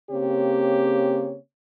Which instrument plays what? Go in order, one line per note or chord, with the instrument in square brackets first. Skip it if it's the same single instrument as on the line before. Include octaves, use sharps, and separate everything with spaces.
[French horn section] C#3 A#3 C4 G4 C#5